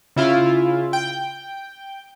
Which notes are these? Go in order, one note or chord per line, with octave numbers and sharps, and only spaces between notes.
C#3 E4 F4 F5
G5